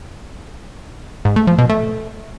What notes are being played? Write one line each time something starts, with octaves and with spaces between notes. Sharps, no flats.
G#2
A3
F3
B2
A3